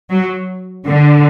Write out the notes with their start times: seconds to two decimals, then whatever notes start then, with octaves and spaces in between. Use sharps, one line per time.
0.10 F#3
0.88 D3